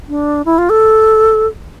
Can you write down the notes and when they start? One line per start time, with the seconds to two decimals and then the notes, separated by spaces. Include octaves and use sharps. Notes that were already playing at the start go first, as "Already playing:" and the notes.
0.09 D4
0.45 E4
0.58 F4
0.69 A4